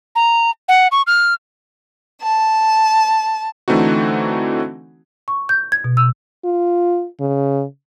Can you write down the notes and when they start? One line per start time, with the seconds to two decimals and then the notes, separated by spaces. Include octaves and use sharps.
0.15 A#5
0.69 F#5
0.92 C#6
1.07 F6
2.22 A5
3.68 D3 E3 A3 C4 D#4 F#4
5.28 C#6
5.49 G6
5.72 G#6
5.84 B2
5.97 E6
6.45 F4
7.20 C#3